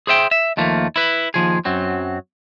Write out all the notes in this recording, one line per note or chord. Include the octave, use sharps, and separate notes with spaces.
G#4 C5 E5 G5
E5
D#2 F3 A3 A#3
E4 B4
D#2 F3 G#4
F#2 F#3 C4